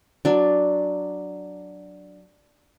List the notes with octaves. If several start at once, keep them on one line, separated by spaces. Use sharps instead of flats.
F#3 D4